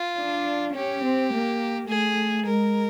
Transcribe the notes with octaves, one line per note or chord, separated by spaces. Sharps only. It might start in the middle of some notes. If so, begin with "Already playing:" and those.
Already playing: F4
D4
C#4 G4
C4
A#3
A3 G#4
G#3 A#4